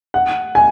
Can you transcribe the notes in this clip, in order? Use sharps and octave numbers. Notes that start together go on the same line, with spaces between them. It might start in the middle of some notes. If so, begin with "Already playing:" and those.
F#5
G#5